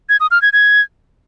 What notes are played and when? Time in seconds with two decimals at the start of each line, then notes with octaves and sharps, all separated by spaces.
0.09 G#6
0.20 D#6
0.31 F6
0.42 G#6
0.53 G#6